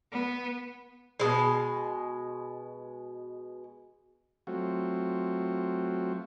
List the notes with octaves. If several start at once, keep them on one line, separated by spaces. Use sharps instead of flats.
B3
B2 E3 G#3
F#3 A3 C4 F4 F#4